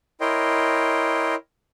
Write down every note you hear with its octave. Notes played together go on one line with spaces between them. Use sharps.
E4 A#4 C#5 D#5 G5 C6